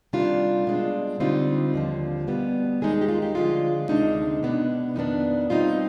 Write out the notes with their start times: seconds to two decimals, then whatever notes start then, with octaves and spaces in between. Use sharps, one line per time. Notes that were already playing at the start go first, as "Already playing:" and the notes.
0.13 C3 D#3 G3 D4 F4
0.67 B2 G#3 D4
1.20 D3 G3 C4 D#4 F4
1.74 D#2 D3 F3
2.28 B2 G3 B3
2.81 D#2 D#3 G#3 B3 D#4 G#4
3.01 G4
3.08 F4
3.22 G4
3.35 D3 F3 G#3 F4
3.89 D2 C3 D#3 G#3 D4 D#4
4.43 B2 B3 D4
4.96 F2 D#3 B3 D4 D#4
5.50 B2 G3 C4 D#4 F4